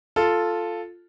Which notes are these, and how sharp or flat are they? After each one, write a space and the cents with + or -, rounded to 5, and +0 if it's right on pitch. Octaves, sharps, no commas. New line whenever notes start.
F4 +0 A4 +0